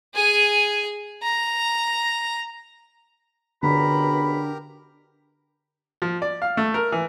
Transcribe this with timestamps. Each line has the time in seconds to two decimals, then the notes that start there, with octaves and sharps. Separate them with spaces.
0.14 G#4 G#5
1.23 A#5
3.63 C#2 B2 D3 D4 G4 A#4 A#5 B5
6.02 F3
6.22 D5
6.42 F5
6.57 A3
6.74 A#4
6.92 E3